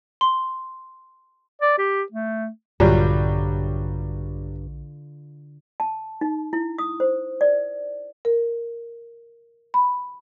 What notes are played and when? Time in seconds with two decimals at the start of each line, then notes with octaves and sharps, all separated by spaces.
0.21 C6
1.62 D5
1.79 G4
2.12 A3
2.80 A#1 G2 D3 F#3 G3 F4 G6
5.80 A5
6.21 D#4
6.53 E4
6.78 D#6
7.00 C5
7.41 D5
8.25 A#4
9.74 B5